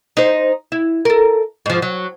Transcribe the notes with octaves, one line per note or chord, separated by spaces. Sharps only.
D#4 C5
E4
A4 A#4
G#2 F3
F#3